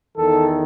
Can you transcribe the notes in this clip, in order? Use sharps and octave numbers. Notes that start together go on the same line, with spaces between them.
E2 D#3 A4